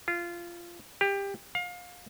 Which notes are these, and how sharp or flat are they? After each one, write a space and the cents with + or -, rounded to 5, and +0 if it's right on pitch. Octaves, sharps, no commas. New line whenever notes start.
F4 -15
G4 +20
F5 +30